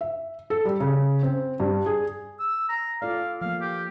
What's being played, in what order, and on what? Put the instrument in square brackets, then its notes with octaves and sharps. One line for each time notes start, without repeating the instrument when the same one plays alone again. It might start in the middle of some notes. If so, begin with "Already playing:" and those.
[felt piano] E5
A4
G3
C#3
C4
G2
G#4
[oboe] E6
A#5
[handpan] F4 A4 D5 [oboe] F5
[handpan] F3 A#3 [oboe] F5
[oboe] G4